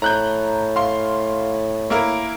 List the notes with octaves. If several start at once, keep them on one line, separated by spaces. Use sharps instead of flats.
A2 A#5 F#6 G6
F5 C6
A#3 E4 A#4